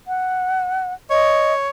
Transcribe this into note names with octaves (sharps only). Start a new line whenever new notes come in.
F#5
C#5 D#5